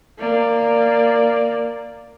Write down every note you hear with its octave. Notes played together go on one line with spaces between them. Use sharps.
A#3 D5